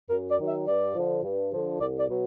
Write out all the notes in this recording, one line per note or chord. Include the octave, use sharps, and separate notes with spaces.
F#2 A#4
D5
D#3 F#3
E5
G2 D5
D3 F3
G2
D3 F3
C2 D5
D5
B2 F#3